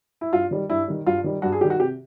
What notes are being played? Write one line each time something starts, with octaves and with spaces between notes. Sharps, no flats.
E4
G2 F4
D#3 G3
G2 E4
D#3 G3
G2 F4
D#3 G3
G2 F#4
G#4
D#3 G3 G4
F#4
C3 G4